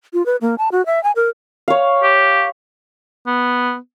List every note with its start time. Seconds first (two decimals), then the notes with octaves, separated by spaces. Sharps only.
0.13 F4
0.26 B4
0.41 A#3
0.58 A5
0.72 F#4
0.86 E5
1.04 G#5
1.16 A#4
1.68 C#5 F5
2.03 G4
3.27 B3